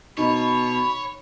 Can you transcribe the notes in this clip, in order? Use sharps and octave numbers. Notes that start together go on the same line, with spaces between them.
B2 D#4 C#5 B5